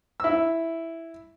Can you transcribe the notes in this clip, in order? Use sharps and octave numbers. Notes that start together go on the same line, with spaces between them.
E4 E6